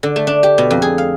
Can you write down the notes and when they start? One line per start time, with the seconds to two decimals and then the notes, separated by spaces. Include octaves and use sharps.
0.03 D3
0.16 A3
0.27 D4
0.43 G4
0.58 B2
0.71 F2
0.82 G#4
0.98 F5